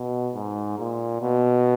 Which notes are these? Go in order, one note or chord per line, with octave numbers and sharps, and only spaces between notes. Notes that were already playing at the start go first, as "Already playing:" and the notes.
Already playing: B2
G#2
A#2
B2